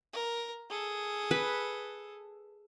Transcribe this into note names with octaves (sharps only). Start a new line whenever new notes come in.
A#4
G#4 A4
B4